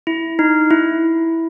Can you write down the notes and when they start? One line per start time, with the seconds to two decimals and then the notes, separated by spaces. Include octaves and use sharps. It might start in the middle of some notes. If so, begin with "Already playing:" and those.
0.07 E4
0.39 D#4
0.71 E4